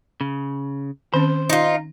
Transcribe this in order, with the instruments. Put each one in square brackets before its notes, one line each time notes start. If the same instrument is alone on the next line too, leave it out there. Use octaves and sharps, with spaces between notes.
[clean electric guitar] C#3
[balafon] D#3 C4 C#4 [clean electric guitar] C5
[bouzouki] D#4 F4